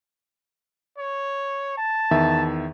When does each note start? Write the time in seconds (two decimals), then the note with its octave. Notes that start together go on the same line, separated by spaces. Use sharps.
0.98 C#5
1.77 A5
2.11 E2 D#3 E5